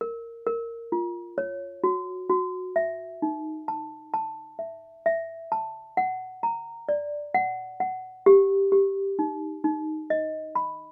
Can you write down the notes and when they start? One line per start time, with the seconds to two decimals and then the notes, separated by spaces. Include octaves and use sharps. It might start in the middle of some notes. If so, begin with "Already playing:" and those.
0.01 A#4
0.47 A#4
0.92 F4
1.38 C#5
1.84 F#4
2.29 F#4
2.76 E5
3.22 D#4
3.68 A5
4.14 A5
4.59 E5
5.06 E5
5.52 A5
5.97 F#5
6.43 A#5
6.89 D5
7.34 F#5
7.80 F#5
8.26 G4
8.72 G4
9.19 D#4
9.64 D#4
10.10 D#5
10.55 B5